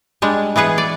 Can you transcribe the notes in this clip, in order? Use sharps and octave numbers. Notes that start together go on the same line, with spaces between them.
G3 G#3 D4
E3 B3 G#4 B4 F#5
D5